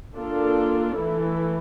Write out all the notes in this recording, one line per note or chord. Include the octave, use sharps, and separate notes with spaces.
A#3 D4 F4 A4
E3 A3 E4 A4